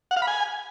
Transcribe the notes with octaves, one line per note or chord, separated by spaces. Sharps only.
F#5
F5
B5
G#5